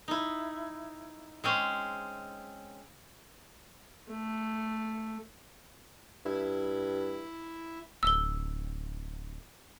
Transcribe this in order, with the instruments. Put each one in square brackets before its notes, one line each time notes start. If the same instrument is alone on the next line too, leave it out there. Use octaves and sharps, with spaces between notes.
[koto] D#4 E4
G#3 C4 C#4
[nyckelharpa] A3
[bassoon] G2 [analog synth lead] E4
[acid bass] D1 [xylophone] E6 G7